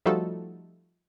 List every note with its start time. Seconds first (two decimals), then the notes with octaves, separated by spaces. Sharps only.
0.06 F3 G3 A3 D#4 F#4 A4